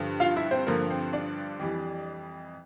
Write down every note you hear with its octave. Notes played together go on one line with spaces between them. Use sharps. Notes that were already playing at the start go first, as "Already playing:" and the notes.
Already playing: G2 D3 F3
F4 F5
E4 E5
C4 C5
G2 D3 F3 A#3 A#4
C4 C5
D4 D5
F2 E3 G3